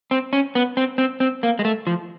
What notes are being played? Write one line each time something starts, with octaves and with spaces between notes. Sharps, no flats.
C4
C#4
B3
C4
C4
C4
A#3
G#3
A3
F3